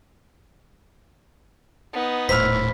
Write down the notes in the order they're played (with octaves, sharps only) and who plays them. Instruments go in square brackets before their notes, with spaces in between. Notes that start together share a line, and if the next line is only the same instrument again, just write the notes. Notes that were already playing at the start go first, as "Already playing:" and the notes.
[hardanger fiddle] B3 D#4
[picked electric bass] D#1 A2 [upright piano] C5 E6 F6 [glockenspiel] B5 B6